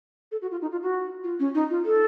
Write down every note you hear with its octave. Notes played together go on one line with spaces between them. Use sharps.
A4
F#4
F4
D#4
F4
F#4
F4
C#4
D#4
F4
A4